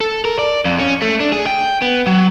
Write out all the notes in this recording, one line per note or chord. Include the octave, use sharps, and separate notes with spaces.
A4
A#4
D5
F2
C#4
A3
D4
G#4
G5
B3
F#3